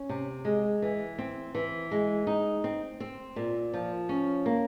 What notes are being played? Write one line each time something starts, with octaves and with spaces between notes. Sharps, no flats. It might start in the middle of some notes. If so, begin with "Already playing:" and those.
Already playing: C#4
C3
G#3
E3
C4
E3
G#3
D#4
C4
C4
A#2
F3
C#4
A#3